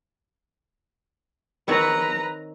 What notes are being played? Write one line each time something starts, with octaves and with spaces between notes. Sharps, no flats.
D#3 C4 B4 C#5 A#5